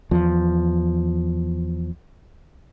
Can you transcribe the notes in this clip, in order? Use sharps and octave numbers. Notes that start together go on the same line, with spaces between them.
E2 F3